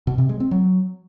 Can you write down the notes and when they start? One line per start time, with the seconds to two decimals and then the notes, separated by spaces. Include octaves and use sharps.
0.07 B2
0.18 C3
0.29 G#3
0.40 C4
0.51 F#3